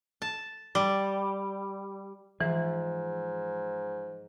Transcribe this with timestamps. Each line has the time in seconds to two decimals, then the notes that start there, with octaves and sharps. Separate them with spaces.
0.22 A5
0.75 G3
2.40 G#2 E3 F3